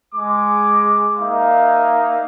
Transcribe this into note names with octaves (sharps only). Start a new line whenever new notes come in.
G#3 D6
A#3 D#4 E5 F5